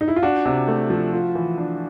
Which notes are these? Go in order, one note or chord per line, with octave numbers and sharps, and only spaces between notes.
D#4
E4
F4
D4 F#4
C3
A3
F3
F4
E3
D4